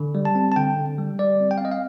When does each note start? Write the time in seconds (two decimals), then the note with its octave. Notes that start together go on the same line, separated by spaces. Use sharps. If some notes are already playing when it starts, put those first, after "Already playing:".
Already playing: D3
0.15 G3
0.25 A5
0.35 C4
0.52 A5
0.56 D3 G5
0.77 D3
0.98 G3
1.19 G3 D5
1.40 C4
1.51 G5
1.58 F5
1.61 C4 D#5
1.72 F5